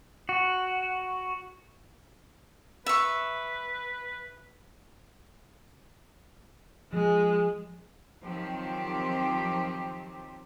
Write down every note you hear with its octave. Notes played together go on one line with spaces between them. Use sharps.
F#4
B4 E5 C#6
F3 G#3
D#3 F3 F#3 C4 G4